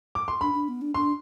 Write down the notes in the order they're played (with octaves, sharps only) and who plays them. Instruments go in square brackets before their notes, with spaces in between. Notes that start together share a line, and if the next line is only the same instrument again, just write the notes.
[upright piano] D6
C6
[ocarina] D4 [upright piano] B5
[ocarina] D4
B3
D4
[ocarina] D4 [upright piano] C6